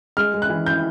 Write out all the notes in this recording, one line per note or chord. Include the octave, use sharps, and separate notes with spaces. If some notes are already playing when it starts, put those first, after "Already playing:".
G#3 F6
G#3
F#6
E3
G6